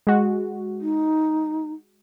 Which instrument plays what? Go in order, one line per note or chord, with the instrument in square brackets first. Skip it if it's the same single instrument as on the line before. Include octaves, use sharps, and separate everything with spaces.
[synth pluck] G#3 F#4
[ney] D#4